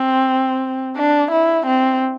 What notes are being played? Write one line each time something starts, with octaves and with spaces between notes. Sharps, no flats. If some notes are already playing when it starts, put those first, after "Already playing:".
Already playing: C4
D4
E4
C4